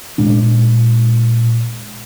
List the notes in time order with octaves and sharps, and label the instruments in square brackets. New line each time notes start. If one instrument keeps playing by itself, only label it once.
[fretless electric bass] A#2 G#3 D4